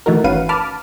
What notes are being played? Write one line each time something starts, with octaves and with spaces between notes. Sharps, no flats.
D#3 E3 A3 D#4 F#4 A#4
G1 C#4 B4 F5 F#5 D#7
A5 B5 D6 F6